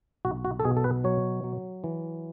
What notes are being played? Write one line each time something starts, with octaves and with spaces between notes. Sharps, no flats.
B1 F#4
F#4
A4
B2 G#4
A4
B4
F#3 C#5
F#3
E3